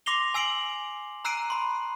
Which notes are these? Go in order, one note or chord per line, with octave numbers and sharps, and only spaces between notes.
C6 D6 A#6 C7 F7 G7
G#5 E6 C7 D7 F#7
A#5 E6 F#6 C7 D7 D#7
B5 C6